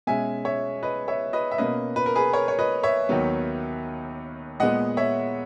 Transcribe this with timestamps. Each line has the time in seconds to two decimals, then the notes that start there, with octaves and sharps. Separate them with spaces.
0.07 B2 G#3 C#4 E5 G#5
0.45 C#5 E5
0.83 B4 D#5
1.08 C#5 E5
1.33 B4 D#5
1.51 E5
1.58 B2 A#3 C#4 B4 D#5
1.96 B4
2.06 A#4
2.15 G#4 B4
2.33 A#4 C#5
2.48 C#5
2.59 B4 D#5
2.83 C#5 E5
3.09 D#2 D#3 F#3 B3
4.60 A#2 G#3 B3 D#5 F#5
4.97 C#5 E5